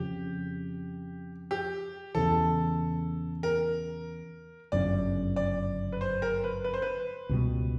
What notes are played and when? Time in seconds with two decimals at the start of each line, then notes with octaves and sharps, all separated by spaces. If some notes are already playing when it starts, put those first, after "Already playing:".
Already playing: F2 C#3 F3 G4
1.51 G4
2.15 E2 C#3 E3 A4
3.43 A#4
4.72 G1 F#2 C#3 D5
5.36 D5
5.92 B4
6.01 C5
6.22 A#4
6.44 B4
6.64 B4
6.74 C5
6.82 B4
7.29 C#2 B2 G3